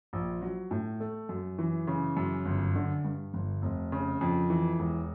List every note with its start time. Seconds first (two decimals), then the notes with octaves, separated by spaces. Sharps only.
0.13 A#1
0.42 F#3
0.71 A2
1.00 A3
1.29 F#2
1.59 E3
1.87 C#3
2.17 F#2
2.46 G1
2.75 D3
3.05 G2
3.34 G1
3.62 F1
3.92 C#3
4.21 F2
4.50 E3
4.79 E1